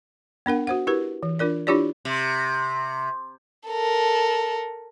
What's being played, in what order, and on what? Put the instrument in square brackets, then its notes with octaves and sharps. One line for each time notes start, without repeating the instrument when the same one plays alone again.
[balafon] B3 D4 A#4 F#5
F#4 C5 F#5
E4 G4 A#4 B4
E3
D4 F4 A#4 D5
D4 E4 F4 G4 C#5 D5
[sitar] C3
[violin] A4 A#4